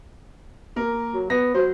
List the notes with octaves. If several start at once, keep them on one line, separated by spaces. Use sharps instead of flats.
A#3 A#4
F#3
B3 A#6
F#3 C5